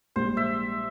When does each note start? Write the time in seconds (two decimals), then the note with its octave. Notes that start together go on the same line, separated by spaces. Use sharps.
0.16 A#1 G#2 G3 C5
0.37 E5